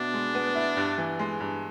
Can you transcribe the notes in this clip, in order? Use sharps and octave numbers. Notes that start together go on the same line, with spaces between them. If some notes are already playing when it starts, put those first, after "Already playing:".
Already playing: B2 B3 D4 E4
G#3
B3
E4
G2
E3
G#3
G2